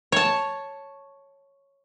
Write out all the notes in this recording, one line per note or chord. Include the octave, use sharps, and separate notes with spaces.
C#5 A5